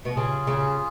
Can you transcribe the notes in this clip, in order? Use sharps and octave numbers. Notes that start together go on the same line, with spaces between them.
B2
C#3 F4 G#4
C#3